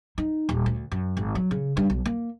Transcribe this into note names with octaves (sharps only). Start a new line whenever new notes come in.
D#4
D#1
D2
F#2
G#1
F#3
C#3
G2
B1
A#3